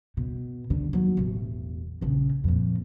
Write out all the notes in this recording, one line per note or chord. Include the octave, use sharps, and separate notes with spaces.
B2
D3
D#2 F#3
E1 A1
A#1 C#3
F2 A#2